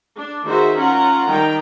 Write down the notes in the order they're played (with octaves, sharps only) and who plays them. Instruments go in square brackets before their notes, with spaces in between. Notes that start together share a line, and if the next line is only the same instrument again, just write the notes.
[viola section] D4
D#3 F#4 G#4 C5 E5 A#5
C#4 F4 A#4 F#5 A#5
D#3 G3 D#4 G5